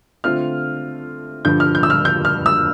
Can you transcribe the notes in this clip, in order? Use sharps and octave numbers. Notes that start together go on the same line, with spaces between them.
D3 A3 C4 F4 F6
G2 D3 F3 G6
F6
G6
E6
F6
G6
F6
E6